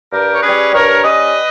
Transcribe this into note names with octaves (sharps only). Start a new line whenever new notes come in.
G2 G4 A#4
C#5
G3 C#4 G#4 B4
G2 A#4 C#5
G3 C#4 B4 D#5